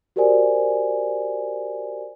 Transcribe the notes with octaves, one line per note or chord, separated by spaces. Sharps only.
F#4 G4 A#4 C5 D5 G#5